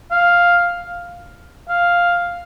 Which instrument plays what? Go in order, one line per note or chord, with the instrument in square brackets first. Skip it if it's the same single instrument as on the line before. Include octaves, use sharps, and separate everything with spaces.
[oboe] F5
F5